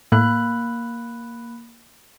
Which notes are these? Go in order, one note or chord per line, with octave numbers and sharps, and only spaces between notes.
A2 A#3 B5 F#6